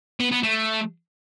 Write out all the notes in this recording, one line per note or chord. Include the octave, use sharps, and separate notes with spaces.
B3
B3
A3